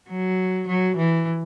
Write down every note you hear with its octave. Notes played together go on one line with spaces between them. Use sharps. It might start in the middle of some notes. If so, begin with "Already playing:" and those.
F#3
F#3
E3